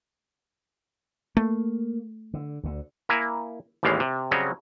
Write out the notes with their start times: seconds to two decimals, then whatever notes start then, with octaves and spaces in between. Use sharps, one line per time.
1.37 A3 A#3
2.34 D3
2.64 D2 D3
3.09 A#3 E4 G#5 A#5
3.83 A1 D#2 E3 G3 G#3 F5
4.00 C3
4.31 C#3 F#3 G3 C4 C#5 D#5